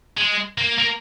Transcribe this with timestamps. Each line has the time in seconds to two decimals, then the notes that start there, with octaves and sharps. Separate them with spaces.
0.18 G#3
0.58 A#3
0.79 A#3